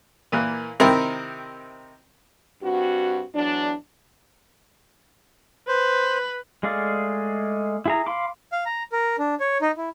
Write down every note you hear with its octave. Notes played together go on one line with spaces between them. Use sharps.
A#2 E3 A#3
C3 D#3 C4 E4 A#4
G2 C4 F#4
E2 F#3 D4
B4 C5
G#3 A3 G#4 D5 F5
E4 G#4 A#5
F5 B5 C6 D6
F5
A#5
A#4
D4
C#5
D#4
E4